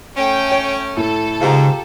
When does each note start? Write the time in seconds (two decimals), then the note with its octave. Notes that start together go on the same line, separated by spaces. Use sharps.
0.17 A3 C#4 G5
0.52 C#5
0.97 A2 A4
1.41 G#2 C#3 F4 G4 A#5